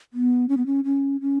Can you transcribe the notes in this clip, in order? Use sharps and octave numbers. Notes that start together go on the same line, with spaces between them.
B3
C#4
B3
C#4
C#4
C#4